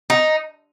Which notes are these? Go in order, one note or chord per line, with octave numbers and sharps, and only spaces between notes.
D#4